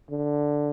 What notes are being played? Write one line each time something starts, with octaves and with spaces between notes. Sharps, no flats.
D3